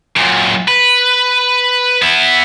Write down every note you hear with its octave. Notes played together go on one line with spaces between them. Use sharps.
F#2 A#2
B4
B3 E4